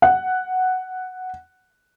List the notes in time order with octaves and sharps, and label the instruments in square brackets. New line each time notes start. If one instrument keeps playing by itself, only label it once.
[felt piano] F#5